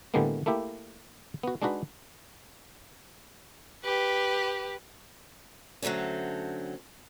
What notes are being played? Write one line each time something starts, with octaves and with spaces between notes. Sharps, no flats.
A2 D3 G3 G#3 A#3 B3
A3 A#3 E4 G4
B3 F#4
G#3 D4 D#4 F#4 B4
G4 B4
D3 F#3 A3 C4 C#4